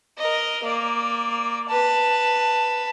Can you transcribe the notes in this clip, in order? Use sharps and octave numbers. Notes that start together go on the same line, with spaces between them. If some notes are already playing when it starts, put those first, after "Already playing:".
A#4 D#5
A#3 D5
B4 A5